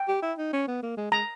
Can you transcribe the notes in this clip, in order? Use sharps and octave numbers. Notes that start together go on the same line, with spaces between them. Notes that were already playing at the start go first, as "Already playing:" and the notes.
Already playing: G5
G4
E4
D#4
C#4
B3
A#3
G#3
G#3 A#5